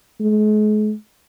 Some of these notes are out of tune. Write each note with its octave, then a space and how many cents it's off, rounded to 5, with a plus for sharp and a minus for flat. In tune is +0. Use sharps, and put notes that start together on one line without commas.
G#3 +40